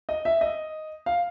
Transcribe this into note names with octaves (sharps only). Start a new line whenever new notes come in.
D#5
E5
D#5
F5